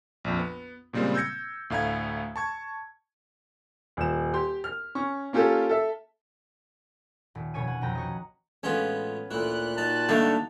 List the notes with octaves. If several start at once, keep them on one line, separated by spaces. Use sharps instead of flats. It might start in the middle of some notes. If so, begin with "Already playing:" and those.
A#1 F2
B3
A#2 C#3 G3 G#3 A#3 C4
E6 G6 G#6 A#6 C#7
D2 A2 F5 A#5 G#6
A5 C#6 G#6
D#1 E7
G4 C6
F6
C#4 C#6
A#3 C#4 F4 G4 A4
A4 E5
D#1
F1 B2 C#4 C#5 G#5 D#7
F#5
F1 B1 F2 G5 A#5 D#7
F#4 D#5
A1 G#3 B3 C#4 F4
D2 A#2 E3 F#6
D#4 F#4 A5
G2 D3 F#3 A3 A#3 D#4